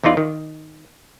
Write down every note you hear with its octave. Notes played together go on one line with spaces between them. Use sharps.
E2 E3 D#4 F4 D5
D#3